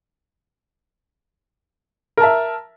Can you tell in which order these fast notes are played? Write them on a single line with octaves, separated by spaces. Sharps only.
A#4 A5 E5